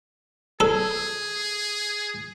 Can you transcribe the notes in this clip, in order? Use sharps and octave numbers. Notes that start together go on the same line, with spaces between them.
G#4 A4